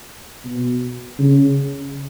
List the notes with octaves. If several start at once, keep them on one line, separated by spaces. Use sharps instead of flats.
B2
C#3